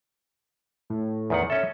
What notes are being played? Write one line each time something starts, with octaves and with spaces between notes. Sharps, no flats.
A2
E2 D#3 F#5
C#4 A4 E5